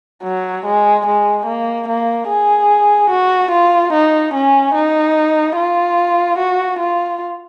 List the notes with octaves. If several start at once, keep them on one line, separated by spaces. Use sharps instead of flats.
F#3
G#3
G#3
A#3
A#3
G#4
F#4
F4
D#4
C#4
D#4
F4
F#4
F4